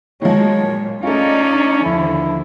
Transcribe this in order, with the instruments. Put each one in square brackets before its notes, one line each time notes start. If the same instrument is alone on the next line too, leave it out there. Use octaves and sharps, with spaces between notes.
[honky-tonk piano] D#3 F3 [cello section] F#3 G#3 [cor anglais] C#5
[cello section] A#2
[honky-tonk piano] A3 F4 [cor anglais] C#4 [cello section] D#4 D5
[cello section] D#2 D3 F3 [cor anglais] E4